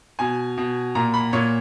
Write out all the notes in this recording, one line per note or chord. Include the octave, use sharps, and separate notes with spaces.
B2 G#5
B2
A#2 A#5
B5
A#2 C#5